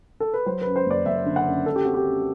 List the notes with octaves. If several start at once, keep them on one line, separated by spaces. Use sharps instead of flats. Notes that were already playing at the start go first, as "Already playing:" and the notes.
A4
B4
F#3 C5
F#2 B4
C5
F#1 D5
F#1 E5
D3
F#5
F#2
F#2 A4
G4
C4 F#4
G4
F#2